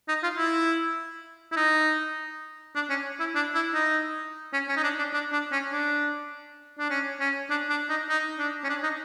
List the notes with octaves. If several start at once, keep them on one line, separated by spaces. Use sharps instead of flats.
D#4
F4
E4
E4
D#4
D4
C#4
E4
D4
E4
D#4
C#4
C#4
D#4
D4
D4
D4
D4
C#4
D4
D4
C#4
C#4
D4
D4
D#4
D#4
D4
C#4
D4
D#4